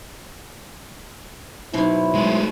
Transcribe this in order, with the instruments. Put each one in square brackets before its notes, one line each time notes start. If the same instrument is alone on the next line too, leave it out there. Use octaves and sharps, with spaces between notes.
[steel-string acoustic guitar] G#2 B2 F#3 [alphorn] E4
[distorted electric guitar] G#3 A3